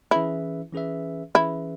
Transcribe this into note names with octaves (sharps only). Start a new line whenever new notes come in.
E3 C#4 E4 G#4 B4 E5
E3 C#4 G#4 B4 E5
E3 C#4 E4 G#4 B4 E5